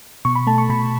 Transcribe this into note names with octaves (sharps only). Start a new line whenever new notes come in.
B2 C#6
B5
A3 A5
C#6
B2 B5